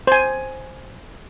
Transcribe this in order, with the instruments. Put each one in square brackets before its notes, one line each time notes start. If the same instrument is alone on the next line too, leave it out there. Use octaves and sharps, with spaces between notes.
[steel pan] C5 G#5